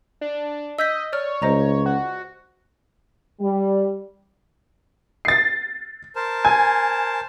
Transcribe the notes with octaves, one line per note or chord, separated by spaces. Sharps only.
D4
D#5 E6 G6 B6
C#5 D5 F6
C#2 C5 D#5 A#5
F#4
G3
A6 C7
A#4 C5 A5
G#5